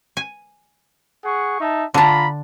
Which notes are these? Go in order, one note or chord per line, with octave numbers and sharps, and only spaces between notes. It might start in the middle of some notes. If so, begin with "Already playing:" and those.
G#5
G#4 F#5 C#6
D#4 E5 A5
D3 D4 F4 A#5 B5